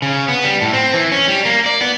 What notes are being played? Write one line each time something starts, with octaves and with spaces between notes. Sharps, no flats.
C#3
B3
G3
A2
C4
E3
C#4
G3
A#3
D5
B3